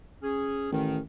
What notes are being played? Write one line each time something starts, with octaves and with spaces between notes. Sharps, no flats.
C#4 G#4
A1 D#3